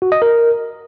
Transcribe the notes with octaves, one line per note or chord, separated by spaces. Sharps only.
F#4
D#5
A#4